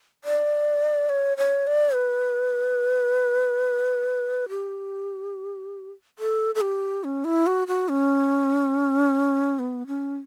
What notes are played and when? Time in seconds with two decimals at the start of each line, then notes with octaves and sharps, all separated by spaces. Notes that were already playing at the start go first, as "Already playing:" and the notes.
0.24 D5
1.09 C#5
1.38 C#5
1.67 D5
1.94 B4
4.49 G4
6.19 A4
6.55 A4
6.61 G4
7.04 C#4
7.25 E4
7.47 F#4
7.68 F#4
7.89 C#4
9.59 B3
9.87 C#4